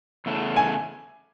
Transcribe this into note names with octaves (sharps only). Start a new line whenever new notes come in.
E2 C#3 A3
G#5